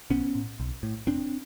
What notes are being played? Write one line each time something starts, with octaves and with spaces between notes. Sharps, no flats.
B1 B3 C#4
A2
B1
A2
F1 C4 D4